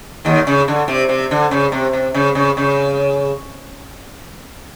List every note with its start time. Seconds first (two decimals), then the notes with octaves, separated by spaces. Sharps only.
0.25 D#2 D#3
0.47 C#3
0.68 D3
0.88 C3
1.09 C3
1.31 D3
1.51 C#3
1.72 C3
1.93 C3
2.14 C#3
2.35 C#3
2.57 C#3